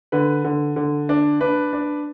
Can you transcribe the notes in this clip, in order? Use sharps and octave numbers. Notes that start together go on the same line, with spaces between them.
D3 B4
D3
D3
D4
D4 B4
D4